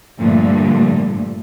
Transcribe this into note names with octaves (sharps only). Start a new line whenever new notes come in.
G2 A#2 D3 F3 G3 A3